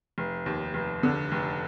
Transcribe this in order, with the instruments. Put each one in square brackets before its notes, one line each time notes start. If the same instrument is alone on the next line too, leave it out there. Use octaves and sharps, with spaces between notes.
[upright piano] F1
D#2
F1
D3
F1